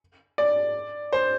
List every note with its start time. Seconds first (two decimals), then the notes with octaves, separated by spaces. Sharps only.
0.38 D5
1.13 C5